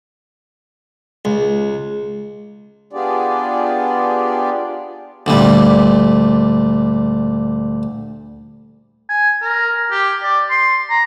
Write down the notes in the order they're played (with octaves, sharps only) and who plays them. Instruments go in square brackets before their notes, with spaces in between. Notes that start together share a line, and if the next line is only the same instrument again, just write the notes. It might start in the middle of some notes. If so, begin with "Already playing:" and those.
[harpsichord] C#2
[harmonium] B3 D4 F4 G4 G#4 D5
[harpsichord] D2 A#2 G3
[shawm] G#5
A#4
G4
D5
C6
A#5